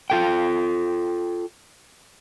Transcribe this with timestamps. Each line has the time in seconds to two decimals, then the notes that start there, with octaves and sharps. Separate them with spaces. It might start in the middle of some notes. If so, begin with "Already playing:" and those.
0.10 F4 A4 G5